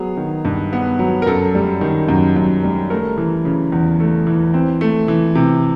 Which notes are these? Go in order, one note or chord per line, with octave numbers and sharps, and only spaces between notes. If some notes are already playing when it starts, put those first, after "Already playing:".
Already playing: F#3 B3 G#4
D#3
G2
B3
F#3
A#4
F#2 A4
G3
D#3
F#2
F#2
G3
A3 A#4
E3
C#3
E2
A3
E3
C4
A3
E3
C3